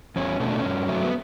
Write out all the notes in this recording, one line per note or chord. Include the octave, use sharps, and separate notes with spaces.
E2 C#4
B2 A3 C#4
D4
C#4
G2
F#3 A3
B3